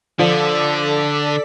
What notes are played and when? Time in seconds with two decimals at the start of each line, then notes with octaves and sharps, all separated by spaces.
0.19 D3 F3 A4 D5 B6